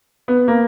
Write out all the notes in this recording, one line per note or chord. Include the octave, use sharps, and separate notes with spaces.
B3
A#3